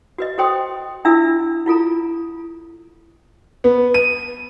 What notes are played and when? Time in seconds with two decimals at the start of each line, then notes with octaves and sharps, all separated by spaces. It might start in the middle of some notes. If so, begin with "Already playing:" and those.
0.18 F#4 B4 D#5
0.38 F#4 A4 C5 G5 C6 D#6
1.05 D4 E4 F4 A4 E5 E6
1.66 E4 F4 A4 A#5
3.64 B3
3.94 D#7